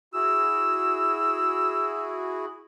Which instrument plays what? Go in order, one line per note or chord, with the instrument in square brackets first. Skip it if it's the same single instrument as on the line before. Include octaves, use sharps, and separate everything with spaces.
[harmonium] E4 F#4 G#4 [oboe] E6